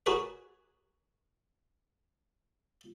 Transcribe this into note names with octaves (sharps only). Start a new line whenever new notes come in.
F#4 G#4 A#4 B4 C#5 D5